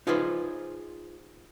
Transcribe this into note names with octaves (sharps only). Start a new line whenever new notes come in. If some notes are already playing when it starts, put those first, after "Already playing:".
D#4 F4 G#4 B4 C5